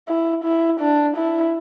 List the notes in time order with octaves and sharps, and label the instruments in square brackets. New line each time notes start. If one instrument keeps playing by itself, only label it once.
[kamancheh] E4
E4
D4
E4